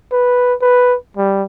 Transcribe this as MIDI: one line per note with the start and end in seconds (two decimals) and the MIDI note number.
0.12 0.54 71
0.62 0.96 71
1.17 1.43 55